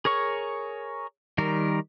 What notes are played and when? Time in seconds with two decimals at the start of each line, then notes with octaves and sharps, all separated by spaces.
0.05 G#4 A#4 C#5 C#6
1.38 D#3 G3 A#4